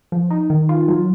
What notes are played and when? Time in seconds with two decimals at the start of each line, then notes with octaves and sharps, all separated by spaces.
0.12 F3
0.30 D#4
0.50 D#3
0.69 F4
0.88 F#3